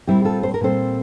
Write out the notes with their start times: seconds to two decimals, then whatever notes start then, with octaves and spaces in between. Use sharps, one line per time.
0.07 A#2 G3 C4 E4 G4
0.25 F4 A4
0.43 C5
0.54 A#4
0.61 A#2 G3 C4 A4 C5